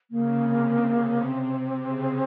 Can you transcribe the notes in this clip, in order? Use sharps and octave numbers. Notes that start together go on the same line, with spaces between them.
C#3 A#3
C3
C4
C#3